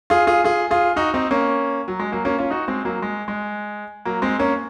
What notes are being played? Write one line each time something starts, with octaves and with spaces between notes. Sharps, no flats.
F4 G#4
F4 G#4
F4 G#4
F4 G#4
D#4 F#4
C4 D#4
A#3 C#4
F#3
G#3
F#3 A#3
A#3 C#4
C#4 F4
D#4 F#4
G#3 C4
F#3 A#3
G#3
G#3
F#3 A#3
G#3 C4
A#3 C#4